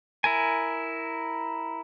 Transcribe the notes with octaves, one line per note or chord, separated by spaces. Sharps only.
E4 A#4 G#5